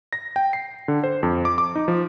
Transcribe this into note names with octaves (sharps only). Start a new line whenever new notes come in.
A#6
G5
C7
D3
C5
F2
D6
D6
D#4
F3